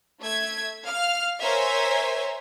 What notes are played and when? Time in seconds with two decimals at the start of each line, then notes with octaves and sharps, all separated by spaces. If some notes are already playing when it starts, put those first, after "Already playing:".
0.20 A3 E5 G#6
0.84 F5 F6
1.41 A#4 C5 C#5 E5 G#5 A#5